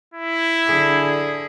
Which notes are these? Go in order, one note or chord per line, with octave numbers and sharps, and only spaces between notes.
E4
D3 G#4